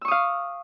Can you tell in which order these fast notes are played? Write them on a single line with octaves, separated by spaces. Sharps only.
E6 C#6 D#6 F5